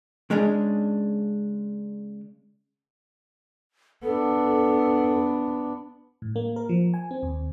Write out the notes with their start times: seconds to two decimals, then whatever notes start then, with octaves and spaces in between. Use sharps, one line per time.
0.30 C#3 G#3 C#4 D4 G#4
4.03 B3 D4 A4
6.22 A2
6.36 A#3
6.56 A#4
6.69 F3
6.94 G#5
7.11 C4
7.23 D#2